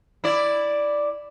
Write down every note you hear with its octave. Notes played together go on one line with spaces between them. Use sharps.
E4 D5